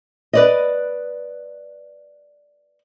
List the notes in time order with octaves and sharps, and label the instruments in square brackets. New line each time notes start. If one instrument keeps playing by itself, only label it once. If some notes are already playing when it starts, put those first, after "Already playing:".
[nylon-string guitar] B4 D5 D#5